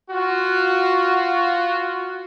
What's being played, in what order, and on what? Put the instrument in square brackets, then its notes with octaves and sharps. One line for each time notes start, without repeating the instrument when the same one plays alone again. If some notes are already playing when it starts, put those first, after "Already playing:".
[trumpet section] F4 F#4